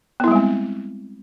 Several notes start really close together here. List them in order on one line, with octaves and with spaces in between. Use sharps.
B3 E4 G3 G#3 C4